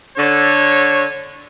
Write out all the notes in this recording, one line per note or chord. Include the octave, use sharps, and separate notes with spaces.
D3 C#5